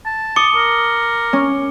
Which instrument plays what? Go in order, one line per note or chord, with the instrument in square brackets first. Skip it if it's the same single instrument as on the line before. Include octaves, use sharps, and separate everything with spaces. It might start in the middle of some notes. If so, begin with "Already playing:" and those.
[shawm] A5
[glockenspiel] D6 C#7 G7 [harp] D#6
[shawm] A#4
[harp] C#4